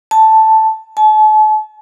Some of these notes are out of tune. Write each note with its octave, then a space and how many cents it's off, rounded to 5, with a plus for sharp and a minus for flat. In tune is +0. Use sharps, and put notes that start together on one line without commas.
A5 +0
A5 -40